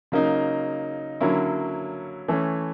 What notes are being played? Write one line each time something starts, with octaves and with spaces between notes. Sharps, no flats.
C#3 F#3 A#3 D#4
D3 F#3 A#3 C#4 E4
E3 A3 C#4